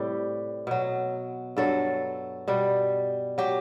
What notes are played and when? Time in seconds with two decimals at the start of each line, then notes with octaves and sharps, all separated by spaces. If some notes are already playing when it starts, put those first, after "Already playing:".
Already playing: A2 C3 G3 G4
0.67 B2 F#3
1.57 G2 F#3 A4
2.48 B2 G3
3.38 F#3 G4